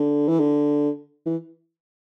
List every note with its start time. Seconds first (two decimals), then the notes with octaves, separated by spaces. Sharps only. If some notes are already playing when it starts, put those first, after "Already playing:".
Already playing: D3
0.29 E3
0.40 D3
1.26 E3